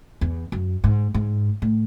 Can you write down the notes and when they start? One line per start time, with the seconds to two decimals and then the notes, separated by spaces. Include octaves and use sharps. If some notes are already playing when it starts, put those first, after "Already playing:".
0.21 E2
0.52 F#2
0.84 G#2
1.14 G#2
1.62 A2